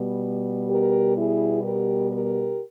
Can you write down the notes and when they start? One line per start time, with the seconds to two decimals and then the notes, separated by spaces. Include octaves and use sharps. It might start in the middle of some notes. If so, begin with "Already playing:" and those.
Already playing: B2 G3 B3
0.69 G4 A#4
1.17 E4 G#4
1.64 G4 A#4
2.11 G4 A#4